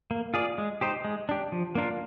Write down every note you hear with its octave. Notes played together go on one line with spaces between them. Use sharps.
A#3
F4 G#4 D5
G#3
D#4 G4 C5
G#3
D4 G4
F3
A#3 D4 F4 A#4